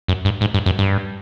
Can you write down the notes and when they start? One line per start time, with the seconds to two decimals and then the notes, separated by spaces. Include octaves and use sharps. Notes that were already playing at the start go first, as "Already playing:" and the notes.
0.08 F#2
0.25 G2
0.41 G#2
0.54 G2
0.66 F#2
0.79 G2